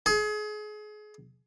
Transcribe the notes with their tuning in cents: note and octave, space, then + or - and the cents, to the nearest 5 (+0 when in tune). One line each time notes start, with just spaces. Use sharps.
G#4 +30